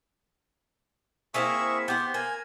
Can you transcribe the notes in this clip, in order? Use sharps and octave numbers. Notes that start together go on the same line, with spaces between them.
A#3 C4 E4 G#4 E5 C#6
B3 G4 C5
A#3 G#5